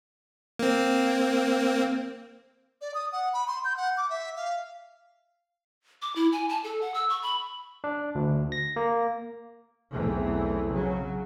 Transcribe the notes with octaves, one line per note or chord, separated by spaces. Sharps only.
A#3 C4
D5
D#6
F#5
B5
C6
G6
F#5
D6
E5
F5
D6
E4
G#5
A5
A4
F#5
E6
C#6
B5
D4
D2
A#6
A#3
B1 E2 E3 A3 C4
C#3 F#3